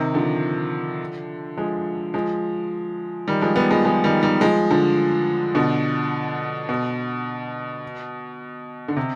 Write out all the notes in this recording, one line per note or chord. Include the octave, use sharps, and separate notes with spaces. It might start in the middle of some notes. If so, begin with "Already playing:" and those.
Already playing: C3 D#3
D3 F3
F3 G#3
F3 G#3
D#3 G3
F3 G#3
G3 B3
F3 G#3
F3 G#3
D#3 G3
D#3 G3
F3 G#3
D3 F3
B2 D3
B2
D3
C3